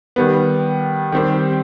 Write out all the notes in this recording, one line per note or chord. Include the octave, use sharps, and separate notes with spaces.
D#3 G3 B3
D#3 G3 C4 G4